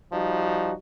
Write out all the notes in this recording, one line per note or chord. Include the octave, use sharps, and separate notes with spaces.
F3 G3 D#4 F#4